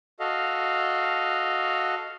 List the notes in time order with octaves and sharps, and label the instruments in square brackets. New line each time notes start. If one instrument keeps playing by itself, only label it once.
[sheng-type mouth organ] F#4 A4 D#5 F5